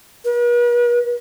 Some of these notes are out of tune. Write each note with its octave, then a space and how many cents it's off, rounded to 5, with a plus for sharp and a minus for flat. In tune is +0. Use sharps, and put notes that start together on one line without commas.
B4 -45